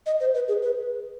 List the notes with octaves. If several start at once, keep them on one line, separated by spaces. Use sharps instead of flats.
D#5
C5
B4
G#4
B4